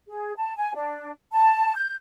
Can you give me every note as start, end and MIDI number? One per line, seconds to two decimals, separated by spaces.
0.08 0.33 68
0.36 0.53 81
0.57 0.74 80
0.75 1.11 62
1.32 1.74 81
1.75 1.95 91